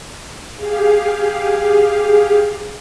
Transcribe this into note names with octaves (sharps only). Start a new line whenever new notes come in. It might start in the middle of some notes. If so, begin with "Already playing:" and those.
G4 G#4 F5